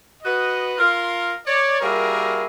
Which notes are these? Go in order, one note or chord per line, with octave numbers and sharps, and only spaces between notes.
F#4 B4 D#5
F4 A#4 C6
C#5 D5
G3 A#3 E4 F#4 G#4 A#4